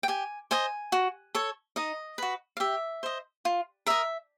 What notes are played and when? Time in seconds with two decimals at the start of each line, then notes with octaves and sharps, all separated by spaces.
0.03 G5
0.08 G4 G#5
0.51 C5 D#5 G#5
0.92 F#4
1.35 A4 C#5
1.76 D#4 D#5
2.18 F#4 B4
2.57 F5
2.60 G4 E5
3.03 C5 D#5
3.45 F4
3.86 A#4 D#5 E5